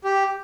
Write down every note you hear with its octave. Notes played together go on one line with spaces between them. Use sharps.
G4